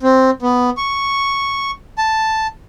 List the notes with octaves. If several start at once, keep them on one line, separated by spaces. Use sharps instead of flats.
C4
B3
C#6
A5